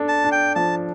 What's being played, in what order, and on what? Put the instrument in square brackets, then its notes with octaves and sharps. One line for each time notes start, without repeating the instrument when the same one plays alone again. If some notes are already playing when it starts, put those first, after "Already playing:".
Already playing: [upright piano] D4 A4
[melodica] A5
[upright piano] D4
[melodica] G5
[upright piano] F3 [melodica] A5